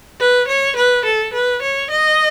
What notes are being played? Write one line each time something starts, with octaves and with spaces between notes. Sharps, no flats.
B4
C#5
B4
A4
B4
C#5
D#5